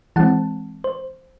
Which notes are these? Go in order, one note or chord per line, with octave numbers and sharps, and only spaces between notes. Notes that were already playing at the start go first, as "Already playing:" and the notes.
E3 G#3 C4 F#5 A5
C5